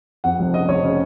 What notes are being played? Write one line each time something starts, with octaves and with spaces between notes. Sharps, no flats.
F2 F#5
F1
C#3 D#5
F1 C#5
C#3